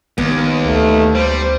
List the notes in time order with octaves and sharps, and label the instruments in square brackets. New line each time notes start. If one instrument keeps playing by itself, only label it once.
[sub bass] A#1 [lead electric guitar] D#2 [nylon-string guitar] B3
[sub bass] D2 [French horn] A3
[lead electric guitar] G3 [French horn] C5